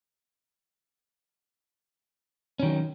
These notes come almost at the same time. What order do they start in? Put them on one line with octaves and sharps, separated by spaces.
C#4 D#3 F#3